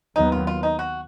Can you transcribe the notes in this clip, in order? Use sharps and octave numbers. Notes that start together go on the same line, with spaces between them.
D#2 D#3 F#3 B3 D#4
F4
F4
D#4
F#4